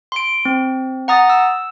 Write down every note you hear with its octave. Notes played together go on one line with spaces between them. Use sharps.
C6 D7
C4
F#5 A#5 D#6 A6
E6